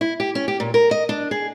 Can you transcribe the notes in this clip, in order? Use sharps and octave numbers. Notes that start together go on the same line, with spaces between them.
E4
G4
C#4
G4
A#2
A#4
D#5
D4
G#4